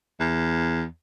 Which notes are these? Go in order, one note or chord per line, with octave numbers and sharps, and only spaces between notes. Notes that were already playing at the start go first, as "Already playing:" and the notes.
E2